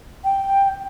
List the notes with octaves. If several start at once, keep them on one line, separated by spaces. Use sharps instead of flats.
G5